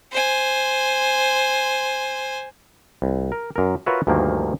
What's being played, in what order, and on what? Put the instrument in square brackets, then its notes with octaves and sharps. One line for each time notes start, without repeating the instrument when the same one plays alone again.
[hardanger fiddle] C5 G#5
[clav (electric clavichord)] C2
A#4
F#2 A#4
F4 F#4 A#4 B4 C#5 E5
D2 G2 D#3 F3 A#3